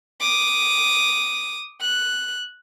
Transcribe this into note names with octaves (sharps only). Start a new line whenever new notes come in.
D6 D#6
F#6